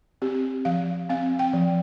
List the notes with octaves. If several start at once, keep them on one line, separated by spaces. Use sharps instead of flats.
C4 G4
F3 F5
C4 F5
G5
F3